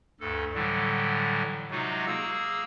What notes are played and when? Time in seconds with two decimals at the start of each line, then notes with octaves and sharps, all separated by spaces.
0.20 D2 G2 A4
0.54 A2 D3 E3 F#3 G3
1.71 C3 F#3 G#3 D#4 F4 F#4
2.07 A#3 G#4 E6